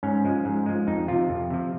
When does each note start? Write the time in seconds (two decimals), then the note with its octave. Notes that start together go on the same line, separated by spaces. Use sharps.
0.03 G#2 C#4
0.25 F3 G#3
0.45 G#2
0.66 F3 G#3
0.87 F2 D#4
1.08 C3 F3 F4
1.29 F2
1.50 C3 F3